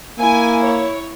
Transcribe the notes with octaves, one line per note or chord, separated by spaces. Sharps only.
A#3 E4 G#5
C#5